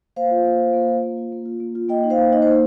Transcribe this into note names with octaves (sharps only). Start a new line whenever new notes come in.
A#3 C5 F5
F4
A#3
F4
A#3
F4
A#3
F4
A#3
F4
A#3
F4
A#3 D#5 G5
D#4
C5 F5
A#3
D#4 D#5
C5
A#3